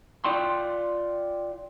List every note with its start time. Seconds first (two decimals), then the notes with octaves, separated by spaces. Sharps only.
0.25 F4 D5 G5 C6